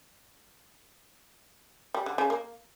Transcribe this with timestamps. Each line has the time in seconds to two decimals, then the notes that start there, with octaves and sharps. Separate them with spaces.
1.94 G3
2.06 D3
2.18 C#3
2.30 A#3